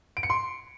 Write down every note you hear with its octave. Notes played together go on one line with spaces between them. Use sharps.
D7
C#7
C6